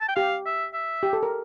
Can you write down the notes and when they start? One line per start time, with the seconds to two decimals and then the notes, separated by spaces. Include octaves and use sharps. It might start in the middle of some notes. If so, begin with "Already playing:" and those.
0.01 A5
0.08 G5
0.16 G4 F5
0.46 E5
0.74 E5
1.03 G4
1.13 A4
1.23 A#4